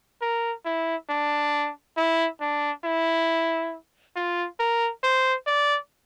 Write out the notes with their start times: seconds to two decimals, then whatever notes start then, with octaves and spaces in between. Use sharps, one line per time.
0.22 A#4
0.65 E4
1.09 D4
1.97 E4
2.41 D4
2.85 E4
4.16 F4
4.60 A#4
5.03 C5
5.47 D5